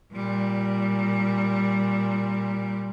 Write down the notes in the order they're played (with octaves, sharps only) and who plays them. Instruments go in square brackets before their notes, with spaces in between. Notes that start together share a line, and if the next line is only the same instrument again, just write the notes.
[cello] A#2 G3